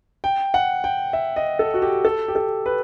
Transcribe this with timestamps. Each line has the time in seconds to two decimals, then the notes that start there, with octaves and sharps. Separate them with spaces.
0.24 G5
0.54 F#5
0.84 G5
1.13 E5
1.36 D#5
1.59 A4
1.74 F#4
1.82 G4
2.05 A4
2.28 G4
2.35 A4
2.66 B4